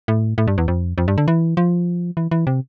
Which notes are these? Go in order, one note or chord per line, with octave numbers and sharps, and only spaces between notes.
A2
A2
G2
E2
F2
F2
G2
D3
E3
F3
E3
E3
C3